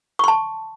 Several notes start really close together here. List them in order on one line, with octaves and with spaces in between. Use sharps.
C#6 C6 A5